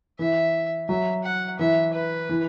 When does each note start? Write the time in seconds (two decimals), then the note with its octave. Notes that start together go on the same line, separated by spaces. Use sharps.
0.19 E3 E5
0.89 F#3 E5
1.24 F#5
1.59 E3 E5
1.94 B4
2.29 E3